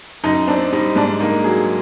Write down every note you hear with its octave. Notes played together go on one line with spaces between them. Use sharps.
F#2 D#4
C4 D4
G3 D#4
G#2 D4
A#3 D#4
F#3 G#4